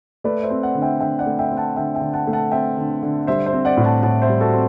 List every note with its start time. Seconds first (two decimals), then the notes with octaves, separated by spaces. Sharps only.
0.24 A3 B4 D5
0.43 C5 E5
0.50 C4
0.63 D5 F#5
0.75 D3
0.82 E5 G5
1.00 D3 E5 G5
1.19 D5 F#5
1.26 A3
1.39 E5 G5
1.51 C4
1.57 F#5 A5
1.76 D3 E5 G5
1.95 E5 G5
2.01 D3
2.13 F#5 A5
2.27 A3
2.33 F#5 A5
2.51 C4 E5 G5
2.78 D3
3.02 D3
3.27 G3 C5 E5
3.46 C5 E5
3.53 C4
3.65 D5 F#5
3.77 A2
3.84 F#5 A5
4.03 A2 F#5 A5
4.22 C5 E5
4.29 G3
4.40 F#4 A4
4.53 C4